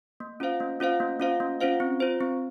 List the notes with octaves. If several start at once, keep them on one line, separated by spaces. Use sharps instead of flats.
A#3
C#4 F4 C5 F5
A#3
C#4 F4 C5 F5
A#3
C#4 F4 C5 F5
A#3
C#4 F4 C5 F5
C4
F4 C5
C4